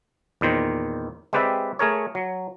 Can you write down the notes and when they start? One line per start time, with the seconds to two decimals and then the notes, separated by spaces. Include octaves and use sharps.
0.41 E2 A#2 D#3 C5
1.33 G#3 C4 G4 B4 D5 E5
1.79 A3 G#4 A#4 C#5
2.15 F#3